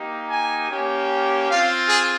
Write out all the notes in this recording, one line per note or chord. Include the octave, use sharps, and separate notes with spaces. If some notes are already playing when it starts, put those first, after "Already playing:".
Already playing: A#3 D#4 G4
G#5
A#3 C#4 G4
C4 F4 F5
G#4